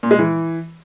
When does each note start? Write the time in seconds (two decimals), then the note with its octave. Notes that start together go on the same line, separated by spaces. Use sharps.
0.03 A#2
0.11 G#3
0.19 E3